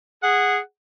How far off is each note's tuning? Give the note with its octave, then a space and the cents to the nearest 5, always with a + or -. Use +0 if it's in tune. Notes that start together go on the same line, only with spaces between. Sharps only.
G#4 -10 F#5 +0